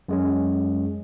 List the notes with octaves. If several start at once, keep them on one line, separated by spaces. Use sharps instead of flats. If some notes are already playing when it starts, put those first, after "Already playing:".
F#2 G#3 C#4